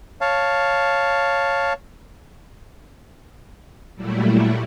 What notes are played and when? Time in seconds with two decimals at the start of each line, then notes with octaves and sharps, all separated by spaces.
0.21 C#5 F5 A5
3.96 A#2 F#3 G3 A3 E4